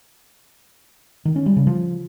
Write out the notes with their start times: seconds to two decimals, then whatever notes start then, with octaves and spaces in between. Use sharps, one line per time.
1.25 D#3
1.36 C#4
1.46 G3
1.56 C#3
1.67 F3